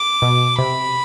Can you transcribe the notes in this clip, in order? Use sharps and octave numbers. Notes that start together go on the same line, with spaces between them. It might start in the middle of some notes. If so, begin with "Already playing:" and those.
Already playing: D6
B2
C3 B5